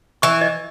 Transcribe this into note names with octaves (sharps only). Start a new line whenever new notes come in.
E3 C#6
D#5